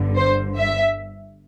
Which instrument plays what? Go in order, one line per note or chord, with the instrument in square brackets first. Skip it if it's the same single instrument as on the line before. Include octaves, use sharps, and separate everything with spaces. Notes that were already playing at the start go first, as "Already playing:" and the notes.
Already playing: [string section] G1 G2 D3
C5
E5